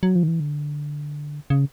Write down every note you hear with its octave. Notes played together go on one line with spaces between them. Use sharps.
F#3
F3
D#3
E3
D3
C#3